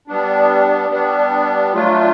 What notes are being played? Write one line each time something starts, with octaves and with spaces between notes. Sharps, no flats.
G3 B3 D4
G3 B3 D4
F#3 A3 D4 F4